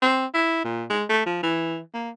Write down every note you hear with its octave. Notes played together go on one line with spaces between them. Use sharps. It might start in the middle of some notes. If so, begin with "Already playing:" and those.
C4
E4
A#2
G#3
A3
F3
E3
A#3